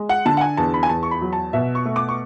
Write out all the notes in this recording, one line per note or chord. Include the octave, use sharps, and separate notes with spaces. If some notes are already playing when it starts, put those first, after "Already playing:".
Already playing: G#3
F#5
D3 A5
F#5
G#5
E2 A5
B5
G#5
E2 A5
C#6
B5
F#3
A5
B2 E5
C#6
A3
D6
C#6